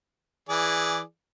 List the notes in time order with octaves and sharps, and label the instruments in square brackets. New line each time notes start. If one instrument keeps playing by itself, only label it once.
[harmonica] E3 G#4 D5